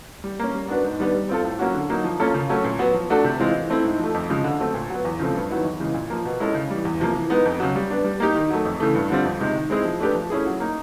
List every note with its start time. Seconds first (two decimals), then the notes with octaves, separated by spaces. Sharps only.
0.24 G3
0.39 A#3 C#4
0.54 G3
0.68 B3 D4 F#4 B4
0.84 G#2
0.99 D#3 G3 B3 D4
1.15 G3
1.29 C4 F4 A4
1.45 A2
1.59 F#3 A#3 C#4 F#4
1.74 D3
1.89 F#3 A#3 D#4
2.04 F3
2.20 A#3 C#4 F4 A4
2.34 C#3
2.49 F#3 A3 C#4
2.64 A#2
2.79 F#3 B3
2.94 F3
3.10 A3 D4 F#4 A4
3.24 C3
3.39 E3 G#3 C4 F4
3.54 E3
3.70 A3 C4 E4
3.84 G#2
4.00 F3 A3
4.14 F2
4.30 C#3 F3 G#3
4.44 D3
4.60 F#3 A3 C4
4.74 A#2
4.90 F#3 B3
5.05 E2
5.19 C#3 F3 A3 C4
5.35 G2
5.50 D#3 F#3 B3 E4
5.65 E2
5.80 C#3 E3 G#3
5.94 A#2
6.10 F3 A#3
6.25 B2
6.40 G#3 C#4 E4 A4
6.54 C#3
6.70 E3 G3
6.85 E2
7.00 C3 F3 A#3
7.15 E3
7.30 G#3 B3 D#4
7.46 F2
7.60 C#3 F#3
7.75 G3
7.90 B3 D4
8.05 G3
8.20 A#3 D#4 G4
8.35 D#3
8.50 F#3 A3
8.65 F2
8.80 C#3 E3 A3
8.95 G2
9.10 D3 G3 C4 F4
9.25 F2
9.40 C3 D#3 G#3
9.56 D#3
9.70 G#3 C4 E4 G#4
9.85 F3
10.00 A3 D4 G4 B4
10.15 F3
10.30 A3 C#4 E4 G#4
10.46 F#3
10.60 A#3 D#4